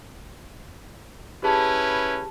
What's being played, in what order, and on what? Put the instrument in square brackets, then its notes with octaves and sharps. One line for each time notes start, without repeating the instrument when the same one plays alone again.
[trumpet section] C#4 E4 B4 [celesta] G4 G#4 A5